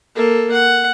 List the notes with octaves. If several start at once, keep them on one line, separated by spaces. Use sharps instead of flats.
A#3 A4
F#5